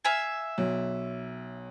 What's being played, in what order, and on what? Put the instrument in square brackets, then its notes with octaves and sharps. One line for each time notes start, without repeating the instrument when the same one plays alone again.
[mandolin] E5 F5 G#5
[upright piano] B1